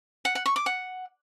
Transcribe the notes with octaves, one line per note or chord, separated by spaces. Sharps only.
F#5
F#5
C#6
D6
F#5